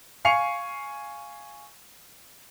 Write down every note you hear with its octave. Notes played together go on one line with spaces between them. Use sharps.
F5 G#5 C#6 C7 C#7 F7